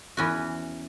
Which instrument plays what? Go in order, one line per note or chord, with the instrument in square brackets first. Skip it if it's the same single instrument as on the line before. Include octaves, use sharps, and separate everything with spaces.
[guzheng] E2 E3 C#4 F#4